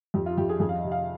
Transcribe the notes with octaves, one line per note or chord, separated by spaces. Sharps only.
F2 G4
F4
F2 G4
G#4
F2 G#4
F5
D#5
C3
F5